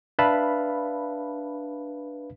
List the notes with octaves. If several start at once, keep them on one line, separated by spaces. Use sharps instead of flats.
D4 B4 E5 F5 A5 B5